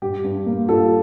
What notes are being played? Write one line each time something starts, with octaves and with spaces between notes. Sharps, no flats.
G2 G4
G2
A#3
G2 F4 A4